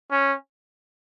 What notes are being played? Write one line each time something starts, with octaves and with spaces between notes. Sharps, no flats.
C#4